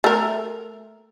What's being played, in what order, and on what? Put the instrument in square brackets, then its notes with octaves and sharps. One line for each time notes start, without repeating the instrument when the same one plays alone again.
[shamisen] A3 A#4